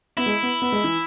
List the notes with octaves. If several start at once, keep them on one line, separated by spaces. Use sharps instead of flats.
B3 E4
G#3
B3
B3
G#3
E3